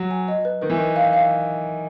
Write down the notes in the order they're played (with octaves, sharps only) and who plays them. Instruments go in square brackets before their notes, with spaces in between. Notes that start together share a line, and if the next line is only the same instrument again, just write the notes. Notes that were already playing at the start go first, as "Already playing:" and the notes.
Already playing: [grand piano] F#3
[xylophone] G#5
D#5
B4
[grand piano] D#3 [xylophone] B4
[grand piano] E3
[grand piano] D#3 [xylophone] B4
[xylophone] F5
F5